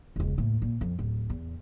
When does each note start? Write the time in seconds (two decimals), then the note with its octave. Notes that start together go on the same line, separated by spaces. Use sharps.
0.16 E1 C#2
0.38 D#2 A2
0.62 A#2
0.81 F2
0.99 D1
1.30 E2